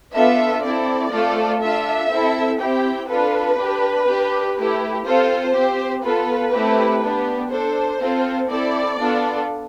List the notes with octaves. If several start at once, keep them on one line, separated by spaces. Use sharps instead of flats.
B3 D4 F4 A4 E5
C4 E4 A4 D5
A3 C4 F4 A4
D4 F4 A4 E5
C4 E4 A4
C4 E4 G4 G5
D4 F4 A4 B4
D4 G4
D4 G4
A3 E4 G4
C4 F4 A4 C5
C4 G4
B3 F4 A4 B4
A3 C4 E4 G4
B3 D4 G4
D4 A4 C5
C4 F4 A4
C4 E4 A4 D5
B3 D4 F4 A4